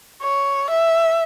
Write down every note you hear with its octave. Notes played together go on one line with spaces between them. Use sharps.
C#5
E5